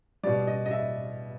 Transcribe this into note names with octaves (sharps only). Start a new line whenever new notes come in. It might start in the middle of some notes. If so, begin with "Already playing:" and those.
B2 G3 D5
D#5
D#5
E5